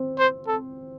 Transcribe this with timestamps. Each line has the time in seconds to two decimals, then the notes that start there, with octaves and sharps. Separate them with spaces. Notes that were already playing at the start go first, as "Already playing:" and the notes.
Already playing: C4
0.18 C5
0.47 A4